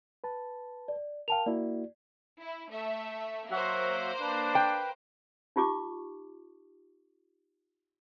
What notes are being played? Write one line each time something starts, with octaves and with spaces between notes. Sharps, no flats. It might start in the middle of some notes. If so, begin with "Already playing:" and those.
B4 A5
D5
A#4 F5 G5 A5 F7
A#3 E4 F#4 D5
E4
A3 E5
F#3 A#3 F#4 C5 E5 F#5
D4 B4
G5
D#4 F4 G4 C#6 D6